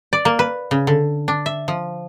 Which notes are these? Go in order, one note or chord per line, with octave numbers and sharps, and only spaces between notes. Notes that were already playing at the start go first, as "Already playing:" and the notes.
D5
A#3
B4
C#3
D3
D4
E5
F3